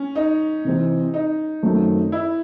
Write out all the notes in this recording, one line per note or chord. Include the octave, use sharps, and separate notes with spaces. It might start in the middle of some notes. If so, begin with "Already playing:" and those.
Already playing: C#4
D#4
C3 E3 C4
D#4
F#2 D#3 A3 C4
E4